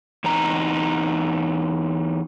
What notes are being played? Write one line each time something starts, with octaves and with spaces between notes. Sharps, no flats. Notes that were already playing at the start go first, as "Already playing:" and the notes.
E2 C4 D#4 A#5